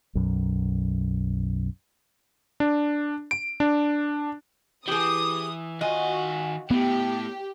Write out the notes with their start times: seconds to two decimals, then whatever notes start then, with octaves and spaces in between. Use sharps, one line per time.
0.15 B1 F#2
2.60 D4
3.31 D7
3.60 D4
4.88 E3 G4 G#4 D#6
5.81 D#3 F4 F#4 D#5 G#5
6.71 A2 B3 G4